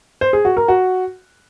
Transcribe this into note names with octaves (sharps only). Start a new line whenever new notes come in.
C5
G#4
F#4
A#4
F#4